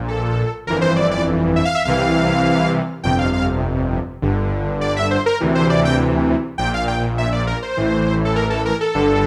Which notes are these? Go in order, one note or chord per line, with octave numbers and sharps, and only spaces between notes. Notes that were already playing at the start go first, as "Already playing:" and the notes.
Already playing: A#1 A#2
A4
G1 F2 E3 A#4
C5
D5
D5
E5
F5
E5
C2 C3 E3 F5
G1 F2 C3 G5
F5
F5
G1 G2 D3
D5
E5
C5
A#4
D2 C3 E3
C5
D5
G5
A#1 A#2 G5
F5
G5
E5
D5
A#4
C5
A1 A2 E3
A4
A#4
A4
A#4
A4
G1 G2 D3